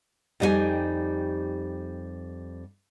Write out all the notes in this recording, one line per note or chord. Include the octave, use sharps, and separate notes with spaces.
F2 G3 D#4 E4 G4 G#5